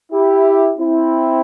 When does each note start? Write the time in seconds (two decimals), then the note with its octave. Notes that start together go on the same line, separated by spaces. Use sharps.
0.12 E4 G4
0.78 C4 E4